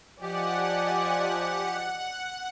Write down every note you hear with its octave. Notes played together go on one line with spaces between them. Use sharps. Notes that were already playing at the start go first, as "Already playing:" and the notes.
F3 G4 D5 D#5 F#5 G#5